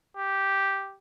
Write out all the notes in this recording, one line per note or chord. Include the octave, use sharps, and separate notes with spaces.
G4